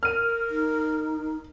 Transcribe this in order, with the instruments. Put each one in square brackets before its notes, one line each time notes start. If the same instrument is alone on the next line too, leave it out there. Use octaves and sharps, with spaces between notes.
[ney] A#4 [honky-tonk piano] F6 D#7
[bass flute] D#4